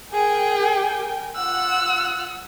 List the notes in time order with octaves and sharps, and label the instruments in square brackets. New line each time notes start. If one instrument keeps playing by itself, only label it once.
[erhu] G#4 [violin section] A#4 G5 G#5
[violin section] F4 F#5 F#6 [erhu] E6